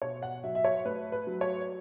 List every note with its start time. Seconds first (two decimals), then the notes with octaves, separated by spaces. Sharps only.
0.02 B2 C#5
0.22 F#5
0.44 F#3 E5
0.55 E5
0.64 C#5
0.85 A3 B4
1.12 B4
1.27 F#3
1.41 C#5